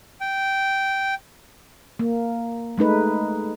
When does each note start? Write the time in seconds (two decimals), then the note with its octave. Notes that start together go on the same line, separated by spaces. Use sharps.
0.20 G5
1.99 A#3
2.78 G#3 A3 D#4 B4